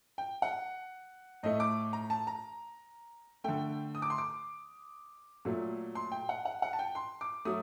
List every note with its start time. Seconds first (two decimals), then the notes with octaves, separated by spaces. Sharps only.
0.18 G5
0.42 F#5
1.43 A2 A3 D#5
1.60 D6
1.93 A#5
2.10 A5
2.27 A#5
3.44 D3 A3 G5
3.95 D#6
4.02 D6
4.10 C6
4.18 D6
5.45 A#2 F#3 A3
5.95 C6
6.12 G5
6.29 F#5
6.45 F#5
6.62 F#5
6.73 A5
6.79 G5
6.95 C6
7.21 D6
7.45 F#3 A3 D#6